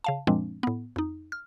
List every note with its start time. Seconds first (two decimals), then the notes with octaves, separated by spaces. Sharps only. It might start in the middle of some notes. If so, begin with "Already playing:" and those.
0.04 C#3 F5 A5
0.27 F#2 A#2 F3 G#3 C4 D4
0.63 A2 B3
0.96 F2 D#4
1.32 F6